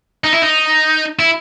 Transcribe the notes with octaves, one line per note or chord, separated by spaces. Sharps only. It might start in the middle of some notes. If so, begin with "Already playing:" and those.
D#4
E4
D#4
E4